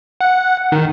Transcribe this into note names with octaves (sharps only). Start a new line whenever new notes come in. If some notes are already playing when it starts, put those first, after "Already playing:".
F#5
D#3